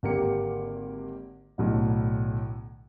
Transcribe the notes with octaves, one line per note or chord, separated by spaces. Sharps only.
G#1 D3 A#3 G4 C#7
B1 A2 D3